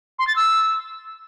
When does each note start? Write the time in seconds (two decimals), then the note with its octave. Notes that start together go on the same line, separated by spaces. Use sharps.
0.19 C6
0.27 A6
0.36 E6